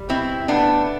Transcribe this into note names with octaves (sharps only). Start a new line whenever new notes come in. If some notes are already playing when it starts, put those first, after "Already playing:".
Already playing: G3
B2 C4 E4
A3 B3 D4